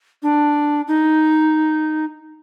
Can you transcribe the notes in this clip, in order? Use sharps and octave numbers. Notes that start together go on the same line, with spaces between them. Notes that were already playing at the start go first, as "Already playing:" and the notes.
D4
D#4